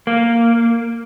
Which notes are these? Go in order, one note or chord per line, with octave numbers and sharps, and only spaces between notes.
A#3